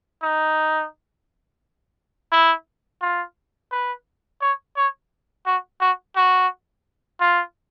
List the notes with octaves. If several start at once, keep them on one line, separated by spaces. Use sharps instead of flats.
D#4
E4
F4
B4
C#5
C#5
F#4
F#4
F#4
F4